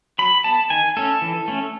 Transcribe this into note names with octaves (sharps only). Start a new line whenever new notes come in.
F#3 B5
B3 A5
D#3 G#5
A3 C#4 A4
E3
A3 C#4